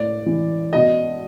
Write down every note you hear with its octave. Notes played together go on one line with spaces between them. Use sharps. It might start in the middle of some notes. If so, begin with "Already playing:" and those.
Already playing: A2 D5
E3
B2 D#5